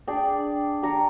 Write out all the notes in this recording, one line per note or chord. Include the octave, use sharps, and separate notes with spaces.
D4 G#4 D5 G5
G4 D5 A#5 C#6